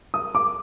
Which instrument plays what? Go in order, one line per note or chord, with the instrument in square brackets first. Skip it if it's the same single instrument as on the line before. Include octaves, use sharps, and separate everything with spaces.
[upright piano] D#6
D6